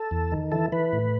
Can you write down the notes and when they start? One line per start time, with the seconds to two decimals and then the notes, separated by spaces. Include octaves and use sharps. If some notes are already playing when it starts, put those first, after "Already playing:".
Already playing: A4
0.11 E2
0.32 D#3
0.52 E3 A4
0.72 E3 B4
0.93 A2